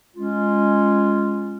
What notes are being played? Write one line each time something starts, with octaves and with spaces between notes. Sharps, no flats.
G#3 C#4 F4